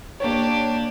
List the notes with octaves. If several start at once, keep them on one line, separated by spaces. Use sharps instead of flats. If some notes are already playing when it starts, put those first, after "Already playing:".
A#3 D4 G4 C#5